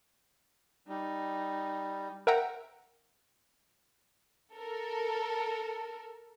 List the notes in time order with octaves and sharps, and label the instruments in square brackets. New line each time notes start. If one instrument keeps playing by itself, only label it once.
[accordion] G3 [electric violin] D#4
[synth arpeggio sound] A#4 E5 F#5 G5 A#5
[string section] A4 A#4